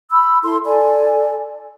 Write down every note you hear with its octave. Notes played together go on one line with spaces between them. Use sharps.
B5 E6
E4 A4 C6
A4 D5 G#5